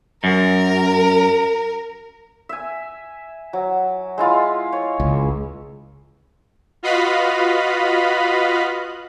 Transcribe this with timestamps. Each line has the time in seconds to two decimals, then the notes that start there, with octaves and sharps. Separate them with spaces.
0.24 F#2 A#4
2.49 E5 G#5
3.53 F#3
4.18 G#3 E4 F4
4.73 C#5
5.00 C#2
6.83 F4 F#4 B4 D#5 F5 B5